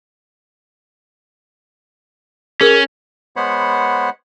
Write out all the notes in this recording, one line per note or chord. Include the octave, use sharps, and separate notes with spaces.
C#4 G#4 A#4
G#3 B3 C5 C#5 F#5 B5